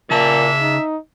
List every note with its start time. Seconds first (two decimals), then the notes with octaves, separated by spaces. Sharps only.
0.11 A#2 C#3 E5 A5
0.61 D#4